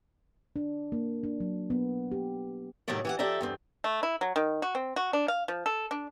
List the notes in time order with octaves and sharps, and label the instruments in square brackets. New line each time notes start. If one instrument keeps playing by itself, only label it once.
[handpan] D4
A#3
D4
F#3
B3
G4
[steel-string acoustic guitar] A2 C3 D#3 F#3 A3 D5
E3 G4 F#5
F3 G4 A4 D5 E5 A#5
E2 G2 C4
[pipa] A3
E4
F#3
D#3
F#4
C4
F#4
D4
F5
F3
A4
D4